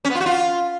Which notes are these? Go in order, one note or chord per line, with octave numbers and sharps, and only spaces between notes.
C#4
B3
F4
F#4
F4